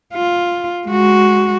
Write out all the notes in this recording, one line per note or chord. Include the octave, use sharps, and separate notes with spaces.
F4
G#3 F#4